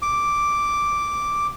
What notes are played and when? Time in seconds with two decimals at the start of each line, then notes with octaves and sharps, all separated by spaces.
0.02 D6